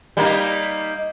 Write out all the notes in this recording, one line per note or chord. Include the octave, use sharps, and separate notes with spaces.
G3 A#3 D#4